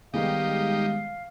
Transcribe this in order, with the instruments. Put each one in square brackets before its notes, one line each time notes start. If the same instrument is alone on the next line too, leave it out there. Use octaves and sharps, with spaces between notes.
[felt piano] D#3 G3 B3 [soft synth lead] G#3 [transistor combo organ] D#4 G4 [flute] F5